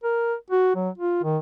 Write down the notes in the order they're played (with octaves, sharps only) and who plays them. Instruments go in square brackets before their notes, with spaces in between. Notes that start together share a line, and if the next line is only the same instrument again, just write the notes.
[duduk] A#4
F#4
F#3
F4
D#3